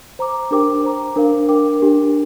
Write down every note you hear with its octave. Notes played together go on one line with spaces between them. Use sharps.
C5 A#5 D6
D4 G4 A#4 G5 D6
C5 A#5 D6
D4 A#4 F5
D4 A#4 G5 D6
D4 G4 A#4